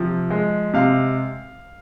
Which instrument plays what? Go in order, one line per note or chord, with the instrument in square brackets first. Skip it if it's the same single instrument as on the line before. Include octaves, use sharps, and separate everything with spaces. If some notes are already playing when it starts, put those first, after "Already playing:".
Already playing: [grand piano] C3 F3
G#3
C3 F5